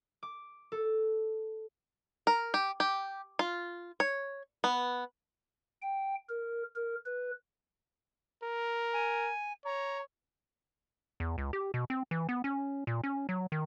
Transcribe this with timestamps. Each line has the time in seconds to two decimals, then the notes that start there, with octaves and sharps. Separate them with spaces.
0.23 D6
0.72 A4
2.27 A#4
2.54 G4
2.80 G4
3.39 F4
4.00 C#5
4.64 B3
5.81 G5
6.29 A#4
6.75 A#4
7.05 B4
8.43 A#4
8.93 G#5
9.65 C#5 A#5
11.20 E2
11.38 C#2
11.53 G4
11.74 B2
11.90 C4
12.11 E3
12.29 B3
12.44 C#4
12.87 A#2
13.04 C#4
13.29 F#3
13.52 D#3